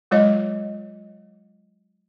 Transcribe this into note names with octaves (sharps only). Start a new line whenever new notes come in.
F#3 G#3 F4 C#5 D#5